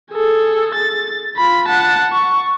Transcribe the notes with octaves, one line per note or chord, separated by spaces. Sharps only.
G#4 A4
A6
F4 B5
F#5 A5
C#6